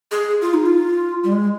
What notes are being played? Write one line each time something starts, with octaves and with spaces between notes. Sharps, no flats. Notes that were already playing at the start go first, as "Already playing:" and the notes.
G#4
F4
D#4
F4
G3
G#3